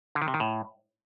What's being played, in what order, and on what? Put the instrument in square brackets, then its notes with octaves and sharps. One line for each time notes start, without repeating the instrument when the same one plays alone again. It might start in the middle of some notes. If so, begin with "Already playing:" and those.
[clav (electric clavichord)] D3
D#3
C3
D#3
A2